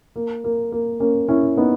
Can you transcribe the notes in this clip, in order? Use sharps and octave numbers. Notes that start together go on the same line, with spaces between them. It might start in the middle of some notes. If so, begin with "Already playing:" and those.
A#3
A#3
A#3
A#3 C#4
C#4 E4
B3 D#4